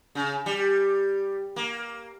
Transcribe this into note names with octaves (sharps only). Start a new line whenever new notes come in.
C#3
G3
A#3